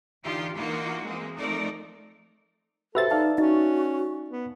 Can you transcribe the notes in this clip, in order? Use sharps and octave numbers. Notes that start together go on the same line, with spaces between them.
D3 E3 D#4 F4 G4
E3 A#3 D#4 F4 F#4
E3 G#3 A#3 C4
F3 A3 C4 D#4 A#4 D5
F#4 G4 A4 B4 C5 E5 A6
D#4 D5 F5 A5
C#4 D#4 F#4
B3